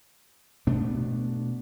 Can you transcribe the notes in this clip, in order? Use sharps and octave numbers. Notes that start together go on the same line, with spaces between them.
B2 A3 B3 D4